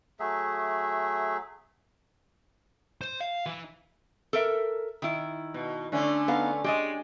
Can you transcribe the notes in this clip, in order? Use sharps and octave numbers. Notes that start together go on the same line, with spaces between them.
F#3 A3 G#4 E5
C5
F5
E3
A4 A#4 E5
D#3 E4
B2
D3 A3 C#4
B3 D#4 F5
G#3 G4 D5 D#5